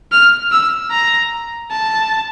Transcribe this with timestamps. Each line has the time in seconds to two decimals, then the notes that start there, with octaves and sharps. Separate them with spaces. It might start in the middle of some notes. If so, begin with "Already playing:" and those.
0.12 F6
0.52 E6
0.91 A#5
1.71 A5